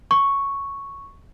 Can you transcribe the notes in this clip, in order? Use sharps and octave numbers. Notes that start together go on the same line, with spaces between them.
C#6